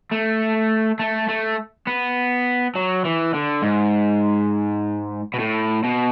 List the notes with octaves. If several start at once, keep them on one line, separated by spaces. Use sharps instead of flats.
A3
A3
A3
B3
F#3
E3
D3
G#2
B2
A2
B2